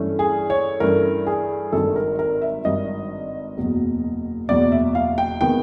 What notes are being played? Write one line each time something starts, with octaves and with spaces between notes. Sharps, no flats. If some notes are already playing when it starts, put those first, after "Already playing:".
Already playing: G2 E3 A3 C#4
G#4
C#5
G2 E3 A3 C#4 A#4
G#4
G#1 G2 D#3 A4
A#4
A#4
E5
G#1 G2 D#3 D#5
F#1 E2 B2 F#3
F#1 E2 B2 F#3 D5
E5
F5
G5
C3 D#3 G#3 B3 G5